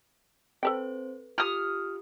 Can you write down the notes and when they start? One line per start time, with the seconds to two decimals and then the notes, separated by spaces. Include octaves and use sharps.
0.63 C4 A4 B4 C5 G5
1.38 F4 G4 D#6 F6